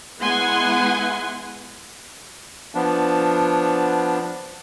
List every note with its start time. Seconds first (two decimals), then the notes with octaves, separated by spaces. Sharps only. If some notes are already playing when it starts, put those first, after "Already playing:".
0.21 G#3 B3 E4 F#5 G#5 C6
2.75 F3 B3 D4